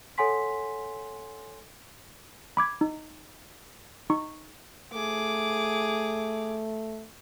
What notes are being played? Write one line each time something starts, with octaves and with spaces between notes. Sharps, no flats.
A4 C#5 F#5 G#5 C6 B6
B5 D6 G#6
D#4
D#4 C#6
A3 G#4 D6